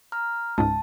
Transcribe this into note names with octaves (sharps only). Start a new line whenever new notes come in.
A#5 F6
C#2 G#2 A5